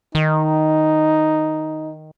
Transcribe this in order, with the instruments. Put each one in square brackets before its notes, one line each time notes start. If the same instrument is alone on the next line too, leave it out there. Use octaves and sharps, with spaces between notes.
[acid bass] D#3 [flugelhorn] D#4